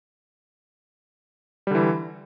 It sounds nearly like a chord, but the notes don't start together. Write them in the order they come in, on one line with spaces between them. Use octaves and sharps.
G3 D3 E3